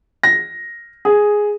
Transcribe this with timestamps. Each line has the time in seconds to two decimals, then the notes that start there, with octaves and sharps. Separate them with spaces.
0.23 A#6
1.05 G#4